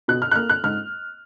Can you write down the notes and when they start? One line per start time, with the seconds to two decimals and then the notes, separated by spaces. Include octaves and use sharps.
0.08 B2 F#6
0.22 F6
0.31 F#6
0.36 A#3 F6
0.49 F#6
0.64 G#2 F6